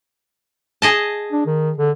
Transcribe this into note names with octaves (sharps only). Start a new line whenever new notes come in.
G#4 D#5 A5
D4
D#3
D3